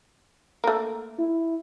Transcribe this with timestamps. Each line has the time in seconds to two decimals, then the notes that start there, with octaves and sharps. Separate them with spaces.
0.64 A3 A#3
1.19 E4